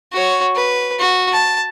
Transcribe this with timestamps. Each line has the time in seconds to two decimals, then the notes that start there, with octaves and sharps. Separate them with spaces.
0.13 F#4 C#5
0.56 B4
0.99 F#4
1.32 A5